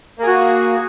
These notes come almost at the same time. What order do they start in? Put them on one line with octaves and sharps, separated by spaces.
A#3 G#4 F#4